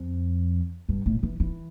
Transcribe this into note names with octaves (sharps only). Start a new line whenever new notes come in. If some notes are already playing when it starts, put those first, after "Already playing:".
Already playing: F2
G2
A2
E3
E3